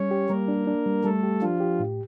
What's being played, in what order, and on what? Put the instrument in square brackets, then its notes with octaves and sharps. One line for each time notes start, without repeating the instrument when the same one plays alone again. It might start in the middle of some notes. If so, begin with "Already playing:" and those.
Already playing: [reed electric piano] G3 [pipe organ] C#4 C#5
[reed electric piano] G4
[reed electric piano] G3 [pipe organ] A#3 A#4
[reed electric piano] D4
D4
G3
[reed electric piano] G3 [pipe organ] A3 A4
[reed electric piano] G4
[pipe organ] F3 F4 [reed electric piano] D4
[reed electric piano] G4
A2